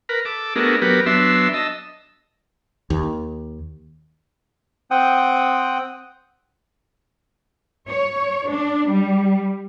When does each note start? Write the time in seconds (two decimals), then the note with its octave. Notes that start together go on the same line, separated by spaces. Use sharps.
0.09 A#4 B4
0.25 A4 D6
0.56 A3 B3 D4 F#4 G#4 A#4
0.82 F#3 B3 G4 A#4 B4
1.06 F#3 B3 D4 E5 C6
1.54 D#5 A5 E6
2.90 D#2
4.91 C4 F#5 G5 D#6
7.89 C#5
8.49 D4
8.89 G3